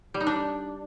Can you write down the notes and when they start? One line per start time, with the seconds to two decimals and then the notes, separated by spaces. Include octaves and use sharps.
0.14 G3
0.20 D#4
0.27 D4